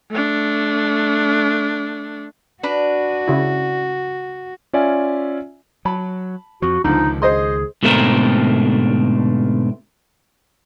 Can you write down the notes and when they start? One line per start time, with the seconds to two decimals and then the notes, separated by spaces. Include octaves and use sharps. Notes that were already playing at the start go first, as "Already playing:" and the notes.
0.10 A3 D4
2.63 D4 F#4 B4
3.28 C#3 E4
4.73 C#4 F4 D5 E5 G#5
5.85 F#3 A5 B5
6.62 F2 F3 F#4
6.84 C#2 D3 D#3 F3 D#4
7.22 G#4 C5 D#5 C6
7.83 G#2 B2 D3 A3 C4 A#4